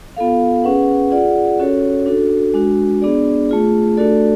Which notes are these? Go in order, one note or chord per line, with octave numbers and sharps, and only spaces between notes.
B3 F4 A4 F5
C#4 G#4 B4 F#5
F4 G#4 D5 F#5
C#4 F#4 A4 C#5
D4 F#4 A4
G#3 D4 F#4
B3 D4 G#4 D5
A3 F4 G#4
A3 D4 F#4 A4 D5